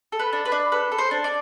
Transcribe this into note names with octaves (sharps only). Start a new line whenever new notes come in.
A4
B4
D4
B4
D4
A4 B4
A4
C5
D4
D5